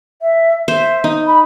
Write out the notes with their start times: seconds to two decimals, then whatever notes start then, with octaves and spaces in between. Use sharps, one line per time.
0.22 E5
0.68 C5 E5
1.04 D#4
1.27 B5